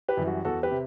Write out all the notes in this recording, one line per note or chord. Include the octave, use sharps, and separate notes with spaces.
G4 B4
F#2 E3 G3
F#4
E2 F#4 A4
G4 B4
C3